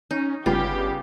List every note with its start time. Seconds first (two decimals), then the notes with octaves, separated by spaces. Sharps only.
0.11 C#4 D#4
0.46 G1 C#3 G3 B3 F4 G4